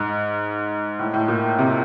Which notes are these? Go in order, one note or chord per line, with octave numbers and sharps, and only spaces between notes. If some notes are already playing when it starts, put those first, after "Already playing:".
Already playing: G#2
A2
A2
A#2
C3